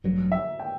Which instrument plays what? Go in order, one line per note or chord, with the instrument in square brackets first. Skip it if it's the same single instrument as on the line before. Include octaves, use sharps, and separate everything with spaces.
[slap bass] A1 G2 F#3
[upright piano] E5
G5